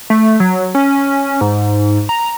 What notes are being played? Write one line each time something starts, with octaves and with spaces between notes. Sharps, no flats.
A3
F#3
C#4
G#2
A#5